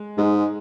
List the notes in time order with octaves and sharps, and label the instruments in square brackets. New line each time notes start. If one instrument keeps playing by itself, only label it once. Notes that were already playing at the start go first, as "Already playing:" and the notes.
Already playing: [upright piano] G#3
[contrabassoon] G#2 [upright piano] G#3